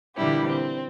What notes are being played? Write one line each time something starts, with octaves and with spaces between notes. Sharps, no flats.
A#2 D3 E3 G3 E4 G4
C4